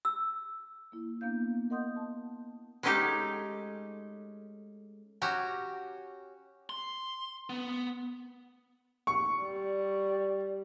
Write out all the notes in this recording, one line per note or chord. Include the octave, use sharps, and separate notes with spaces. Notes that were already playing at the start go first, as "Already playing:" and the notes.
E6
A#3 E4
A#3 B3 D4 F5 G6
A#4 D#5 F#5 C6 D#6 G6
A5
G#3 A3 C#4 D#4 G4 A4
C#4 F#4 G4 A#5
C6
B3
C#6
G3